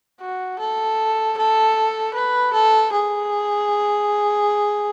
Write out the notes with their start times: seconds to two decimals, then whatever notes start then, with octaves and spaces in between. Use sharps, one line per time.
0.21 F#4
0.59 A4
1.38 A4
2.14 B4
2.54 A4
2.93 G#4